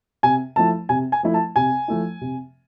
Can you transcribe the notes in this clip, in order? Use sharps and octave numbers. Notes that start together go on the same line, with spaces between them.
C3 G#5
F3 A3 E4 A5
C3 G#5
G#5
F3 A3 E4
A5
C3 G#5
F3 A3 E4
C3